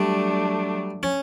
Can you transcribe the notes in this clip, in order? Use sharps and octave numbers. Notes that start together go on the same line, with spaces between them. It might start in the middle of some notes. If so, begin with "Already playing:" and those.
Already playing: F#3 G3 A3 D4
C#4